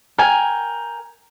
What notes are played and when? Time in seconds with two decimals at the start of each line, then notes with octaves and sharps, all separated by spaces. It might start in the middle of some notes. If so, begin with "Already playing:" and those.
0.18 A#4 G5 G#5